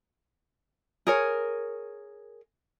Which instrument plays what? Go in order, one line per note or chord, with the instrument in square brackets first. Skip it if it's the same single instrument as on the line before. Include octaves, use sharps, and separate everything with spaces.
[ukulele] G#4 A#4 C#5